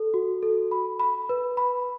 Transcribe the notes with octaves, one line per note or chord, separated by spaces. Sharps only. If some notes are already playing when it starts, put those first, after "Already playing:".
Already playing: A4
F#4
A4
B5
B5
B4
B5